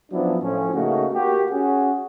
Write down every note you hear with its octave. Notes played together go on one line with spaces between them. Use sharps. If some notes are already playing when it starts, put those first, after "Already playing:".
F3 F#3 B3 C#4 D4 E4
A2 F3 C#4
C#3 A3 A#3 D#4 F#4
A#3 F#4 G4
C#4 F#4 G#4